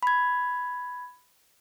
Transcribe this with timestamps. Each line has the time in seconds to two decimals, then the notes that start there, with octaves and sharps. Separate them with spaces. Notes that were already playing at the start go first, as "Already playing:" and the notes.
0.03 B5 G#6